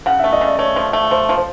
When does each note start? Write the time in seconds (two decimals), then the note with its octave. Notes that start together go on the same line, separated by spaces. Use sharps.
0.06 C#3 F#5
0.19 A3 E5
0.33 D#5
0.41 C#3 D5
0.59 A3 C#5
0.76 F3
0.93 A3
1.11 F3 C5
1.29 F3
1.38 C5